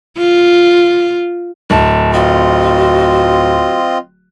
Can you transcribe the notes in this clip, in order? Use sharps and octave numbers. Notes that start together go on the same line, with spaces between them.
F4
D1 A5
C4 F4 F#4 D#5